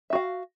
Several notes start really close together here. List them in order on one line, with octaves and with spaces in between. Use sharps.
E5 F#4 F5